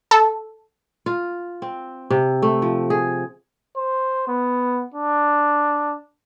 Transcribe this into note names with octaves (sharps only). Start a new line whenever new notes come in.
A4
F4
C4
C3
A3
F3
G#4
C5
B3
D4